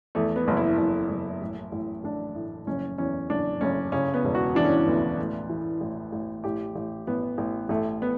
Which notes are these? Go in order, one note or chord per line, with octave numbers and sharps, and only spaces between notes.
E2 A3
B3
F#1
E4
F#1
F#1
A1
A1
A1 D4
A2
F#1 C#4
E2 C#4
F#1 D4
F#1 C#4
C#3 C#4
B3
E1
F#4
E3 D4
C#4
D4
D2 B3
A2
E3
A1
A1
A1 G4
A1
A1 B3
A1
A1 A3
B3